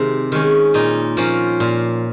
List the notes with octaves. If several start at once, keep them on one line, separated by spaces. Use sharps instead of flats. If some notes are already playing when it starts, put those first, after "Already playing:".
Already playing: C3 D#3 G#3
D#3 G#3 C#4
A#2 D#4
F3 A#3 C#4
A#2